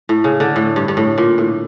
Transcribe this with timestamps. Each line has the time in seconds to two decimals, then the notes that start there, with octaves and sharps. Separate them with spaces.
0.09 A2
0.24 C#3
0.40 D3
0.56 A2
0.76 G2
0.88 G2
0.97 A2
1.18 A#2
1.38 A2